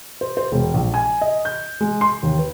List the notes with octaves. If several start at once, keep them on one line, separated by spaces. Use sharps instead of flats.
C5
C5
E1
A#1
G#5
D#5
G6
G#3
C6
D#2
B4